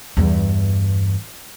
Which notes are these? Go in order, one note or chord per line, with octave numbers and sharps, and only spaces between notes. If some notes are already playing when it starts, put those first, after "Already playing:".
E2 G2